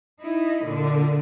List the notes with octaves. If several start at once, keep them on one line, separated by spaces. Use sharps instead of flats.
D#4 E4
A#2 D3